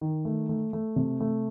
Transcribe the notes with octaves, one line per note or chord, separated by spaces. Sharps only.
D#3
A3
A3
A3
C3
A3